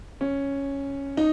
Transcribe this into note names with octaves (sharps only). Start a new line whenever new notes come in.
C#4
D#4